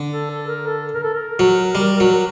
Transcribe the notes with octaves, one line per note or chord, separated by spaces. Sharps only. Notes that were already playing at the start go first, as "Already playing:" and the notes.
Already playing: D3
A4
A4
A#4
A4
A#4
A4
A#4
F#3
G3
F#3